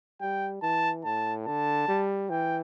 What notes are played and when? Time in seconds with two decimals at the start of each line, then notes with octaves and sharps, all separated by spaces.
0.21 G3 G5
0.63 E3 A5
1.05 A2 A5
1.46 D3 A5
1.88 G3
2.30 E3 G5